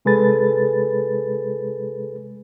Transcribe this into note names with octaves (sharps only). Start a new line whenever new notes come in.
C3 G#3 G#4 A4 B4 A6